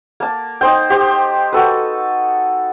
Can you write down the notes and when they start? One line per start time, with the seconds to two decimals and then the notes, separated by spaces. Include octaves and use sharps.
0.20 A#3 A5
0.61 D#4 C5 G5
0.90 G4 C5
1.53 F#4 A4 B4